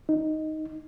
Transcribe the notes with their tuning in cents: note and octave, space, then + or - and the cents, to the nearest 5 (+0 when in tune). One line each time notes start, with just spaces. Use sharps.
D#4 +5